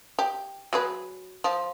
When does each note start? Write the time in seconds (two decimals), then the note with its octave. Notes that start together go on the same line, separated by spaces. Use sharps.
0.19 G4
0.73 F#3 G#4 B4
1.44 F3